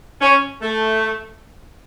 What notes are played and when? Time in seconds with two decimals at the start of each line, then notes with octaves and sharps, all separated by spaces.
0.21 C#4
0.62 A3